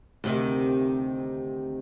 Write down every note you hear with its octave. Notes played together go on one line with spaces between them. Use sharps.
D2 C3 D#3